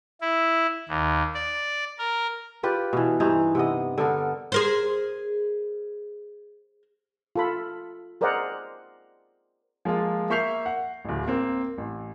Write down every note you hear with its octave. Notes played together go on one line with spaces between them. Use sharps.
E4
D#2
D5
A#4
F4 G4 B4 D5
B2 E3
G2 E3 D#4 C5
C3 B3 D#5
D3 B3 A4 A#4
G#4 A#4 C5
F4 A4 B5
G#4 A#4 C5 D5 D#5 F#5
F3 G#3 A#3 F4
A#3 E5 C#6 G6 C7 F7
F#5
D1 A1
A#3 C4
A1